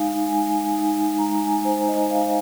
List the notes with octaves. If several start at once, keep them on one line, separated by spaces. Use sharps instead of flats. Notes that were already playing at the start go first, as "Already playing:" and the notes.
Already playing: G#3 D#4 F5 G#5
G#3 G#5
D#4
G#3 A#5
G#5
D#4 C5
D#5
G#3 F5